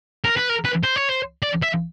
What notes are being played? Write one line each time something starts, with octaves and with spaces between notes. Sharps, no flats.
A#4
B4
A#4
B4
C5
C#5
C5
D5
E5